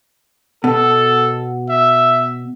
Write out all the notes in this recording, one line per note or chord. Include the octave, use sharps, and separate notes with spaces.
B2 A4
E5